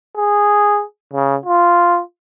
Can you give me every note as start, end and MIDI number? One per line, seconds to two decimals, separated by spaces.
0.17 0.83 68
1.14 1.36 49
1.46 2.00 65